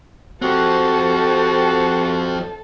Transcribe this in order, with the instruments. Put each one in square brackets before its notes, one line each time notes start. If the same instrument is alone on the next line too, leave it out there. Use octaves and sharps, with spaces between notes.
[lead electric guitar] F3 C4 [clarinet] F#4 [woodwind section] G4 C5 F#5 [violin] A4